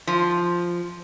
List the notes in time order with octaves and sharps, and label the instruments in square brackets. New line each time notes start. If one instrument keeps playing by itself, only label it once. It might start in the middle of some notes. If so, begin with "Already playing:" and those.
[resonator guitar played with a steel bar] F3